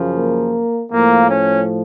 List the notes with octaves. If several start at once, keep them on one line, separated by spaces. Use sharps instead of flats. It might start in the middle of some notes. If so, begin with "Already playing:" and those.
Already playing: F#2 C#3 F3
A#3
A2 F3 A#3
C#4